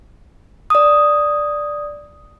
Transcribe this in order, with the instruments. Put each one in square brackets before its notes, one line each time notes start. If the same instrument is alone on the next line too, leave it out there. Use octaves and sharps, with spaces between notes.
[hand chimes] D5 D#6